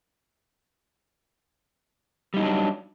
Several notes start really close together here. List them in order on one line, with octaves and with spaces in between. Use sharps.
G3 D#4 F#3 D4